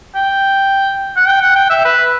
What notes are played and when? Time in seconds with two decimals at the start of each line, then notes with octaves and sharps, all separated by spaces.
0.15 G5
1.16 F#5
1.28 G5
1.42 F#5
1.56 G5
1.70 E5
1.85 B4